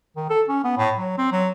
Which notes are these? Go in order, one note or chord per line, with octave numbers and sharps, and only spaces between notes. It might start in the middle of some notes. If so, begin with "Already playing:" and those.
D#3
A4
C#4
B3
A2
F#3
C4
F#3